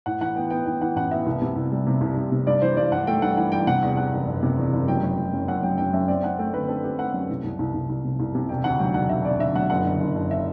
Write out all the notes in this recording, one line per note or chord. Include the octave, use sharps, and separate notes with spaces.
A2 F#5
E3 F#5
B3 G5
B3 G5
E3 G5
E3 F#5
A1 F#5
B3 E5
C2
C3
C2
G3
C3
C2
C2
C3
G2 D5
E3 C5
G2 D5
G2 F#5
A3 G5
G2 F#5
E3 F#5
G2 G5
C3 F#5
E2
E2 F#5
F#1
F#1
C3
E2
F#1
F#3 G5
F#3
F#3
F#2
F#2 F#5
F#3 G5
F#2 G5
F#2 E5
C4 D5
C4 F#5
A3 G5
D3 B4
C4 A4
C4 G4
A3 F#5
F#2
C2
C2
C2
C2
C2
C3
C2
C3
E1 G5
D2 F#5
F#3 G5
E1 F#5
E1 E5
E1 D5
D3 E5
F#3 F#5
F#1 F#5
D3
F#1
F#1
E5